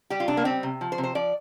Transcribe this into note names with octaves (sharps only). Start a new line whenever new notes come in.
G3 G4
F4
C3 D4
A#3
G3 C4
C3
F3
C5
C3
C5
F3 D5